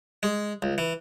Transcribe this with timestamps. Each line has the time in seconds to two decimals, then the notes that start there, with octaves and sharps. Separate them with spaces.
0.23 G#3
0.62 C#2
0.78 E3